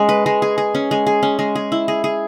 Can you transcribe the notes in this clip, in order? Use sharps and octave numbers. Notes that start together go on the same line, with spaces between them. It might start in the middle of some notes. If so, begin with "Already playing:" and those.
Already playing: G#3 C#4
B4
G#3
G#4
G#4
C#4
G#3
G#4
C#4
G#3
G#4
E4
G#4
G#4